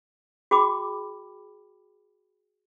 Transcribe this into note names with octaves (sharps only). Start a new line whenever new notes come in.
F#4 G#4 G5 B5 D6